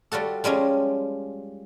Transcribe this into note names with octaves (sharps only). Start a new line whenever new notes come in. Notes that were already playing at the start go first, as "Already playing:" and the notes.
G3 F4 F#4 A4
F3 G3 G#3 C#4